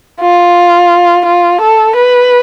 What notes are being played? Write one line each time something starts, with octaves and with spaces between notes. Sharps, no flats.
F4
F4
A4
B4